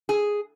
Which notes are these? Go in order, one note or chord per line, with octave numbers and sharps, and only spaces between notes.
G#4